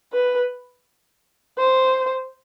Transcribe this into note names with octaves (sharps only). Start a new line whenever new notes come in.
B4
C5